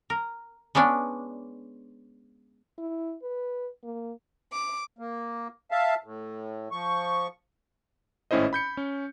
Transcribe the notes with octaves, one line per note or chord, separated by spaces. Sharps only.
A#4
G#3 B3 C#4 D4
E4
B4
A#3
D6
A#3
E5 F5 A5
A2
F3 C#6
G#1 A2 C#4 E4 C5 D#5
B5 G6 C#7
C#4